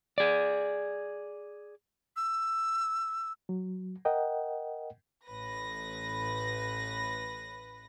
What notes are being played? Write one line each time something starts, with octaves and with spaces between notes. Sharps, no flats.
G#4 D5
E6
F#3
A#4 D#5 F#5 G5
A1 B4 A#6